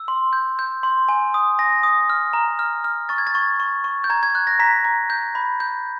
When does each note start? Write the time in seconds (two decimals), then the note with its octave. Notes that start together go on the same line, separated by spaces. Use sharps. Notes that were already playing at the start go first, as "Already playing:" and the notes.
Already playing: E6
0.08 C6
0.33 G6
0.59 G6
0.83 C6
1.09 G#5
1.34 D#6
1.59 G#5 A#6
1.83 D#6
2.10 F6
2.33 A#5
2.59 F6
2.84 F6
3.09 C#6 A6
3.18 G#6
3.27 A6
3.35 C#6
3.60 C#6
3.84 C#6
4.04 G6
4.10 A#5 G#6
4.23 G#6
4.35 F#6
4.47 A#6
4.59 A#5 B6
4.85 A#5
5.10 G6
5.35 B5
5.60 G6